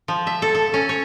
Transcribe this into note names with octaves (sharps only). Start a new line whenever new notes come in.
F3
E5
A4
A4
C#4
C#5